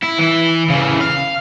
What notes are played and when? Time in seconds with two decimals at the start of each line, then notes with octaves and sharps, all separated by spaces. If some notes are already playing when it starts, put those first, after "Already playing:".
0.02 E4
0.19 E3 E4
0.69 C#3 E3
1.01 F5